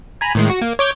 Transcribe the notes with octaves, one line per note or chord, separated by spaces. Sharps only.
G#5 A#5 B5
A2 D#3 G#3
F#4
A#3
C#5 D6 G6